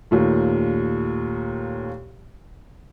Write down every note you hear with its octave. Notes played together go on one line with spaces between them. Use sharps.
D#2 A#2 A3